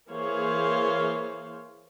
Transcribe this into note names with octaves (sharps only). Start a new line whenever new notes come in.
E3 A#3 G#4 C5 C#5 F5